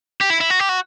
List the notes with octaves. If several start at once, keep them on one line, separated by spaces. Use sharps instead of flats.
G4
E4
E4
F#4
G4
F#4